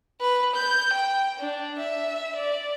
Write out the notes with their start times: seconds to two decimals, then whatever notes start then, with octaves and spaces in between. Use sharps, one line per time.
0.21 B4
0.56 G6
0.93 G5
1.40 D4
1.79 E5
2.36 D5